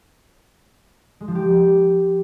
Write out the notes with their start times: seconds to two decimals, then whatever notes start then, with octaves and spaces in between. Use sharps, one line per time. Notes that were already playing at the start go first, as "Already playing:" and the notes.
1.20 G#3
1.28 F3
1.35 G4